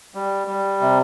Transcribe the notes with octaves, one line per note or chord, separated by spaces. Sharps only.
G3
G3
C3